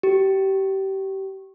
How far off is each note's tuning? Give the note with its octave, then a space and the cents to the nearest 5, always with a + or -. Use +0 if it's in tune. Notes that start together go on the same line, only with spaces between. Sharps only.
G4 -25